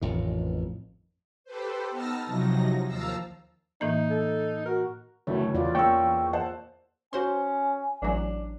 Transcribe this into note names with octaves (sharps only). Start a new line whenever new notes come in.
A1 F2 D#3
G4 A4 B4 C5
B3 D#4 A5 E6 F6 A#6
C3 F3 F#3 D#4 A#6
D#2 F3 F5 A5 A#5 E6
A2 E3 A#3 D#4
A4
F#4 A#4
F#1 D2 E3 A3 C#5
E2 F4 D5
A#3 C#4 G5 C#6 E6
C5 F#5 A5
C#4 F#4 C5 G#5 C6
A1 F#3 D4